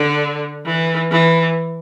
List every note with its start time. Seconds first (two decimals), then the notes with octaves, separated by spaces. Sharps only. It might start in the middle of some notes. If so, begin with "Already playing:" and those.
Already playing: D3
0.65 E3
1.11 E3